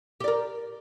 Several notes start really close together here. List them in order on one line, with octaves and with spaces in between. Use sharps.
G4 D5 A#4